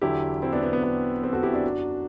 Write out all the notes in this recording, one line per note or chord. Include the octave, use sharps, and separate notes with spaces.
E2 D3 F#3 E4 G4
C4 E4
B3 D4
B3
B3
B3
C4
F#4 A4
E4 G4
D4 F#4
F#2 F#3